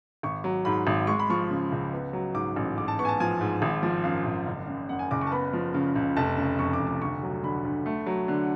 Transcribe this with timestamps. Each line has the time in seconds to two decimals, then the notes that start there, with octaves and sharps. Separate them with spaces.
0.23 G#1 C#6
0.44 F#3
0.65 G#2 B5
0.87 G#1
1.07 G#3 C#6
1.19 B5
1.30 F3 C#6
1.50 C#3
1.72 C#2
1.93 B3
2.13 F#3
2.35 G#2 D6
2.56 A1
2.78 G#2 D6
2.88 A5
2.99 B3 C#6
3.05 G#5
3.08 A5
3.20 F3 G#5
3.41 G#2
3.62 G#1
3.83 F3
4.04 F#2 F5
4.25 G#1
4.46 F#1
4.67 C#3
4.89 F#2 F#5
4.99 G#5
5.11 F#1 D6
5.21 C#6
5.27 A5
5.32 B3 B5
5.53 F3
5.74 C#3
5.95 C#2
6.16 F1 A5
6.37 C#3
6.59 F2 C#6
6.73 D6
6.79 F1
6.87 D6
7.01 D2 C#6
7.22 F#3
7.43 D3 B5
7.65 D2
7.86 A3
8.06 F#3
8.28 D3